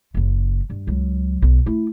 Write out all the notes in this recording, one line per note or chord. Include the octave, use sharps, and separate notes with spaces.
F#1 C#3
G2
C#2 F#3
B1
A3 E4